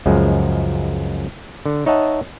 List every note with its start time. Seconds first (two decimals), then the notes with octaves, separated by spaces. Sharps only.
0.06 C#2 F#2 F3 G#3
1.66 D3
1.86 D#4 C#5 D#5 E5 F#5 A5